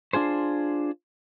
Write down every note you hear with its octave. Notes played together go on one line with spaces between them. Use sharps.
D4 F4 G#4 C5